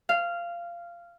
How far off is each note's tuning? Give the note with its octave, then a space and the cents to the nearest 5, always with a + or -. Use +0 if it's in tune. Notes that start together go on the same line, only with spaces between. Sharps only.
F5 -15